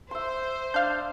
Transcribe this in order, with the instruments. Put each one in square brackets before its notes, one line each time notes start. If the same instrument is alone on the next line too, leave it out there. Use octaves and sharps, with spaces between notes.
[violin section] C5 [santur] E5 C6
[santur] D4 [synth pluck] F5 G6